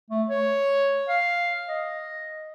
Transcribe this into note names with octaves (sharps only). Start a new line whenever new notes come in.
A3
C#5
F5
D#5